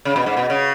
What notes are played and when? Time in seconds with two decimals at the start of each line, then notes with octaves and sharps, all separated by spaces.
0.05 C#3
0.16 B2
0.26 G#2
0.37 B2
0.50 C#3